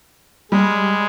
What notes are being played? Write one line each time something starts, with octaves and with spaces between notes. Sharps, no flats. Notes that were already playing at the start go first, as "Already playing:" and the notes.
G3 G#3